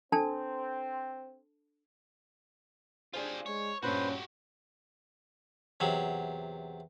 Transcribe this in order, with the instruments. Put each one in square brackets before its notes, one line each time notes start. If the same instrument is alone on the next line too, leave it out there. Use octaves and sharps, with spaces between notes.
[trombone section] C4 [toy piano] D4 A4 A5
[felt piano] D4 G#4 C5 [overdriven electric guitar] F4 G4
[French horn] G#3 [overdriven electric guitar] C#5
[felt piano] G2 A#2 [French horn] C#4 [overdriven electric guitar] F#4 G4 [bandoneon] B4 C5
[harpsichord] E2 C3 F#3